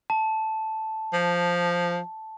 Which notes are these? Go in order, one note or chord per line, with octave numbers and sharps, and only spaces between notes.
A5
F3